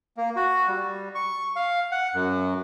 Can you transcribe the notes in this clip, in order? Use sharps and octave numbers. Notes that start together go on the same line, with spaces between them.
A#3
F#4
G3
C#6
F5
F#5
F#2